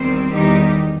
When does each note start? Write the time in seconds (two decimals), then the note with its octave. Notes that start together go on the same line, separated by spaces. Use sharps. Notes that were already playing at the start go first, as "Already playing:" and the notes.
Already playing: E2 D#3 G3 C4
0.30 E2 D#3 G3 D#4 G4